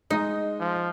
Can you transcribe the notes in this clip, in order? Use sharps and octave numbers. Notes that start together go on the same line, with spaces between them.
G#3 D#4 D#5
F3